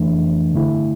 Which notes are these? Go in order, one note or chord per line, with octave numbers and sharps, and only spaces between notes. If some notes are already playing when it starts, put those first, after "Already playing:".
Already playing: F2 E3 A3 D4
G2 D3 A3 E4